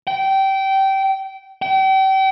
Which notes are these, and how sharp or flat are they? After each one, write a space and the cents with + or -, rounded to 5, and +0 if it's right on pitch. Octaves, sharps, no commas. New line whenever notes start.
G5 -20
G5 -35